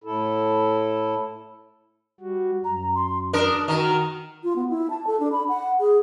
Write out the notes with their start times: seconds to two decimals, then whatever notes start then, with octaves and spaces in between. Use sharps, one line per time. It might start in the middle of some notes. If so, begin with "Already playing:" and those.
0.04 A2 E4 A4
2.20 G3 F#4
2.64 F#2 A#5
2.95 C6
3.33 D4 A#4 D#6
3.68 D#3 F#4 A#5 F6
4.44 F4
4.56 B3
4.69 E4
4.90 A5
5.07 A4
5.20 D4
5.32 B5
5.49 F#5
5.80 G#4